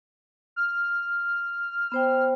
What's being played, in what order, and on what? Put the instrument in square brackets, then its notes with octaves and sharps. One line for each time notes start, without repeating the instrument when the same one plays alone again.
[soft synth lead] F6
[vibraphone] B3 C5 G5